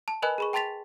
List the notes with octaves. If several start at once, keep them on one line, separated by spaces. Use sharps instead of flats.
A5
A#4 B4 D#5 G#5 B5 F#6
G#4 B5 C#6
G5 A5 C6 A6 B6 F7